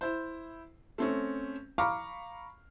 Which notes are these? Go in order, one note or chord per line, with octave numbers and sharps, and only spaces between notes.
E4 C5
A3 C4 C#4
F5 A#5 B5 C#6 D6 F6